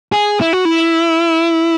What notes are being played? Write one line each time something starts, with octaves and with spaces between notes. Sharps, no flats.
G#4
E4
F#4
E4